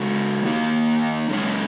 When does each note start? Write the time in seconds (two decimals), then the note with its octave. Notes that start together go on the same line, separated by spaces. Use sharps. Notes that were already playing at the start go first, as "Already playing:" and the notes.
Already playing: C#3 G#3 F#4
0.44 D#3 A#3 D#4
1.30 F#2 C#3 G#3 C#4